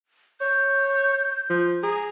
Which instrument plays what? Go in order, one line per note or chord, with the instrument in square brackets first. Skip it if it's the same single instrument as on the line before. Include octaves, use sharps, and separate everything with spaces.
[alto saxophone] C#5 [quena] G6
[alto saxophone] F3
[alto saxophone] G#4 [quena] A#5